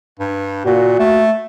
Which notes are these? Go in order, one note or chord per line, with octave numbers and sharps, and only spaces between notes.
G2
A#2 A#3 F#4
A3